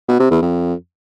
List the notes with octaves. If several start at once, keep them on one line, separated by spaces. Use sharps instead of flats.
B2
C3
E2
F2